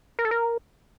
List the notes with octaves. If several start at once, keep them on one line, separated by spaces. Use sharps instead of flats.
A#4
A4
A#4